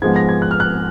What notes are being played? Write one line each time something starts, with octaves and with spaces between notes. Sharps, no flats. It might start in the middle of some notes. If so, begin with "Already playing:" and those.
G#2 F3 G#3 B3 G#6
A#6
G#6
F#6
F6
F#6